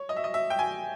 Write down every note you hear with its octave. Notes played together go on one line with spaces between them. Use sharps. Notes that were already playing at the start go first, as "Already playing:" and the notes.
Already playing: C#5
D#5
E5
D#5
E5
G5
G#5